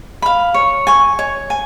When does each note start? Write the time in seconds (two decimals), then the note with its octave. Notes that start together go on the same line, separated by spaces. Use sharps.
0.22 F5 B5
0.54 C#5
0.87 G#5 C#6
1.19 C#5
1.50 G#5